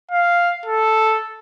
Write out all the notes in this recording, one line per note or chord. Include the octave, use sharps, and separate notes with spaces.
F5
A4